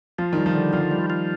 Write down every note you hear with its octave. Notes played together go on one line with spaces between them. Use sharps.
F3 F4
D#3 G3
F3
D3
F3 F4
G3
F4